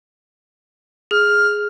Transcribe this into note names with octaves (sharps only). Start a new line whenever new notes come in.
G#4 F6